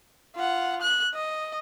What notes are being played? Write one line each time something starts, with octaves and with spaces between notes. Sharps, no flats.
F4 F#5
F#6
D#5